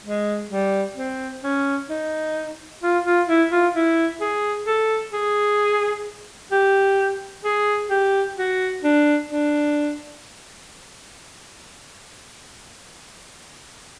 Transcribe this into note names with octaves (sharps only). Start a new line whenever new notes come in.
G#3
G3
C4
C#4
D#4
F4
F4
E4
F4
E4
G#4
A4
G#4
G4
G#4
G4
F#4
D4
D4